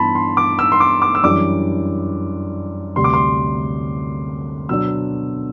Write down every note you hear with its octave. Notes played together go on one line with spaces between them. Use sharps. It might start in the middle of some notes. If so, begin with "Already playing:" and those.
Already playing: G2 E3 B3 D4 A5 B5 C6
C6
D6
E6
C6
D6
D6
E6
F#2 E3 G3 D4 D6
D2 C3 G3 C6
D6
C6
B2 F#3 B3 D4 E6